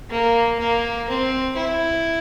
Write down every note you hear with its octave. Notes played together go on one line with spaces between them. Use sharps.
A#3
A#3
C4
E4